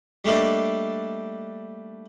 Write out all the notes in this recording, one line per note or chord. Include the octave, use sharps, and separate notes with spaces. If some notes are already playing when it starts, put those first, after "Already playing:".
G3 A3 A#3 D4 D#4